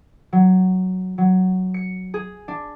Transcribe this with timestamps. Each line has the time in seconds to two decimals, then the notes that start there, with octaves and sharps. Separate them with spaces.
0.33 F#3
1.18 F#3
1.74 C#7
2.14 G#4
2.48 D4